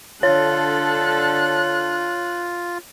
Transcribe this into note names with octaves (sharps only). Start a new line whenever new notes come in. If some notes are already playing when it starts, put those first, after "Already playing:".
D3 F4 A4 C#5 F#6